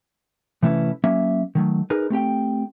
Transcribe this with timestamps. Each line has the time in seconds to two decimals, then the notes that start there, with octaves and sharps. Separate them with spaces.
0.63 C3 E3 A3 C#4 E4 B4
1.04 F#3 A#3 C#4 E5
1.55 D#3 F#3 A3
1.90 D#4 G#4 A#4 B4
2.10 A3 C4 G4 G5